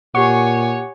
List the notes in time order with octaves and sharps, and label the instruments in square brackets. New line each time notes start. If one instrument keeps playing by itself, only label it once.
[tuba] A#2 [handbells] G4 F#5 [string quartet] C#5 G#5 [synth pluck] C#6